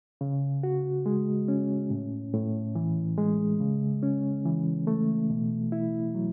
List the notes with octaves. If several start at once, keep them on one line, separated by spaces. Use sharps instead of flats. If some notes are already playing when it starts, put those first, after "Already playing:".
C#3
F#4
G#3
C#4
A2
A2
E3
G#3
C#3
C#4
E3
A3
B2
E4
F#3